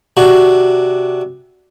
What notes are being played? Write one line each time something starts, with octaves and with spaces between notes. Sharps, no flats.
C3 D4 F#4